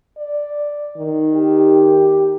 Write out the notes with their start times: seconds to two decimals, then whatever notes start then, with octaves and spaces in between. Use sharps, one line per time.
0.18 D5
0.97 D#3
1.34 G4